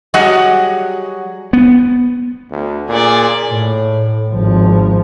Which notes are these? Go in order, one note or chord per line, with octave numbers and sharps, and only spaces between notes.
F#3 G3 F#4 G#4 D#5 F#5
B3
D2
A#2 G#4 D5
A2
G#1 F3